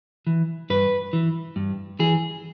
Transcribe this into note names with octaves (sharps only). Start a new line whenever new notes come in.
E3
G2 B4
E3
G2
E3 G#4